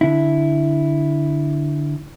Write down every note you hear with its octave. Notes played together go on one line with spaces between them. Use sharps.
D3 E4